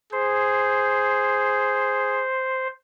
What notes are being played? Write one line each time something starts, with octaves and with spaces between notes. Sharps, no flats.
G#4 C5